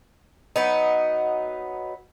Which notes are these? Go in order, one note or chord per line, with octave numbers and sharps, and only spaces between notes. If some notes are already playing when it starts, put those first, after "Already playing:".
F#3 B3 D#4